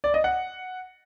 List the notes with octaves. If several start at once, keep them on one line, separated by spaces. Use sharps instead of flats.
D5
D#5
F#5